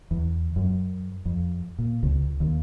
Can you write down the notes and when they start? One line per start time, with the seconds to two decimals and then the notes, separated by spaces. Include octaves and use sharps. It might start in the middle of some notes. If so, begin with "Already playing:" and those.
0.11 E2
0.56 F#2
1.25 F2
1.79 A#2
2.03 C#2
2.40 D#2